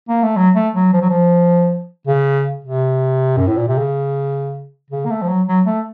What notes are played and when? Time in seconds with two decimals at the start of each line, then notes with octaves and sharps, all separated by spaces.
0.09 A#3
0.23 A3
0.36 F#3
0.55 A3
0.75 F#3
0.93 F3
1.01 F#3
1.10 F3
2.07 C#3
2.64 C3
3.37 F#2
3.47 A2
3.57 A#2
3.68 C3
3.78 C#3
4.91 C#3
5.05 A#3
5.10 A3
5.22 F3
5.28 F#3
5.47 F#3
5.66 A3